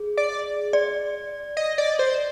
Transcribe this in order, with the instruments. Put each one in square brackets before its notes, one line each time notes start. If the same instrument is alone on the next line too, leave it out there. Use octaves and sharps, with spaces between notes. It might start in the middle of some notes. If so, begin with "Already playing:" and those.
Already playing: [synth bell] G#4
[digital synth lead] D5
[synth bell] D5
[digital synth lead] D#5
D5
C5